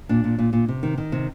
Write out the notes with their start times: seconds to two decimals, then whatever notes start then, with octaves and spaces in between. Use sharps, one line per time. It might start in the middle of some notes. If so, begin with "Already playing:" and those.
0.09 A#2 D4
0.24 A#2
0.39 A#2
0.53 A#2
0.68 C3
0.83 D#3
0.98 D#3
1.12 C3